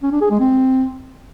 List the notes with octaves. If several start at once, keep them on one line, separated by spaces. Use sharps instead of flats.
C#4
D4
G#4
G#3
C4